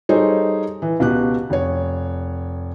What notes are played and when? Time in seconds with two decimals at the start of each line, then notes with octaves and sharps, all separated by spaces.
0.09 G3 D#4 G#4 A4 C5 C#5
0.82 E3
1.00 C#2 B2 G4 F#6
1.50 F1 C#5